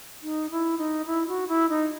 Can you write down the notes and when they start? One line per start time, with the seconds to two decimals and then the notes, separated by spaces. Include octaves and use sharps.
0.23 D#4
0.50 E4
0.78 D#4
1.06 E4
1.27 F#4
1.48 E4
1.69 D#4